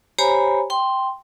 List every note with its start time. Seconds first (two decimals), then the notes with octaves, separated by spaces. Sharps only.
0.18 G4 C5 C#5 G#5 A#5 B5
0.70 G5 C6